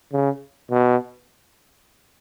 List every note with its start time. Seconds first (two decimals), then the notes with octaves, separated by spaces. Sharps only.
0.13 C#3
0.71 B2